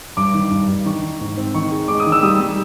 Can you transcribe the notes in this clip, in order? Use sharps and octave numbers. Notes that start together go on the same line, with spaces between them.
G2 D6
D#3
G2
G2
D#3 C#6
D#3
G#2
C4
D#3 C#6
G#3
G#3 D6
D#6
D#3
E6
G3 D#6
G3